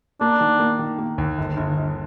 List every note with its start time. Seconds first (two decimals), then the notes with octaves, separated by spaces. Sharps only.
0.21 A#3 D4
0.41 D#3
0.59 A#3
0.79 D#3
0.99 A#3
1.18 D#2
1.38 G1
1.57 G1
1.76 G1